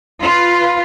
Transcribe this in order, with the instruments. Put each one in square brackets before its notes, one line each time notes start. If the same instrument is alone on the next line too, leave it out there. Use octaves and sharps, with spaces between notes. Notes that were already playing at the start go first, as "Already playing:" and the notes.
[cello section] F4 B4